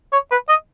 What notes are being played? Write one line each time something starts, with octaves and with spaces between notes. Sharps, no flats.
C#5
B4
D#5